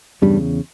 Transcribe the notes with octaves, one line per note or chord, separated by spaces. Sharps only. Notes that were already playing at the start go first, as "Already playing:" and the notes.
E2 G2 C#3 G3